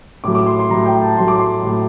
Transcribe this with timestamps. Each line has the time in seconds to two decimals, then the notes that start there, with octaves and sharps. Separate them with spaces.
0.24 A2 F#3 D6
0.35 D6
0.47 C6
0.59 C6
0.70 A2 F#3 A#5
0.86 G5
1.01 A5
1.17 A2 F#3 C6
1.28 D6
1.40 C6
1.63 A2 F#3